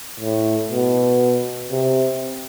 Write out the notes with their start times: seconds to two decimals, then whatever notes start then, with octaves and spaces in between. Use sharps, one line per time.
0.20 A2
0.70 B2
1.71 C3